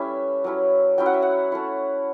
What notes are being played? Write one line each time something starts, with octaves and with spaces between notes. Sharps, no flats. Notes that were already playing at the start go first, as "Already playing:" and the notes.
Already playing: G3 C#4 E4 A4 B4 E5
F#3 C#4 E4
F#3 C#4 E4 G5
F#5
E5
F#5
A3 C#4 E4